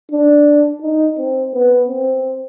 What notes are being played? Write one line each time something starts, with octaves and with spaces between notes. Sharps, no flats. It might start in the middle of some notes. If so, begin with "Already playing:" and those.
D4
D#4
C4
B3
C4